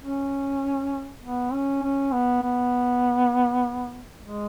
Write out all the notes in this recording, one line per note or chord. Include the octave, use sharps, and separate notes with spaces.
C#4
B3
C#4
C#4
B3
B3
G#3